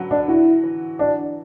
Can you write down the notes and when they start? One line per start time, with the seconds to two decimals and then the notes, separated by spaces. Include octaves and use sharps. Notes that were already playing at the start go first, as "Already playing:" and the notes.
Already playing: D3 F#3 B4
0.11 D4
0.28 E4 F#4
0.64 E3
0.99 D4 F#4